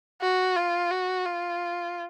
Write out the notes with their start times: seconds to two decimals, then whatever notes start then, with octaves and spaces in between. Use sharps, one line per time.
0.21 F#4
0.56 F4
0.91 F#4
1.26 F4